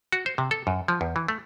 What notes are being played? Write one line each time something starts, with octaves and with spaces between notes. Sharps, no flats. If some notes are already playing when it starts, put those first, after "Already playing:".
F#4
C5
C3
A4
F#2
F3
E2
E3
A3